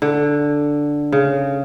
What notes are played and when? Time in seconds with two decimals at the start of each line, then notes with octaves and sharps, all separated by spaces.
0.02 D3
1.12 C#3